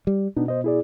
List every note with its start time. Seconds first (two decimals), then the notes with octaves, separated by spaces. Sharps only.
0.07 G3
0.37 B2 B3 D4 D#4
0.48 C5 D#5
0.64 E4 G#4 D5